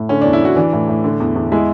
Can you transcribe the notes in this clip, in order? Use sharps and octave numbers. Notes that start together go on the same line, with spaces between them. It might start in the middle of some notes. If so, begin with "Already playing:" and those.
Already playing: A2
D3 C#4
E2 D4
E4
E2 F#4
E3 D4
A2
A2
D3
E2
E2
G#3 E4